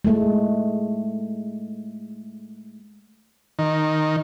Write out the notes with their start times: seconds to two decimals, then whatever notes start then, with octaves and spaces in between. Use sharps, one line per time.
0.05 G#3 A3
3.59 D#3